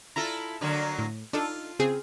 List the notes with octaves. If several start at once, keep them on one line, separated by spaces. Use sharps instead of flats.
E4 F4 A4 A#5
D3 F#3 A#3
A2
D4 D#4 F4 A4
C#3 C4 G#4